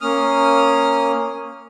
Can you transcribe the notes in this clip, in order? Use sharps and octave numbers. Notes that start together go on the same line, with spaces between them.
A#3 C#4 D#6 F6